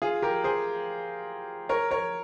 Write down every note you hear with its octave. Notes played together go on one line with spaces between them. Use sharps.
F4 G#4
G4 A#4
G#4 C5
A#4 C#5
A#4 C#5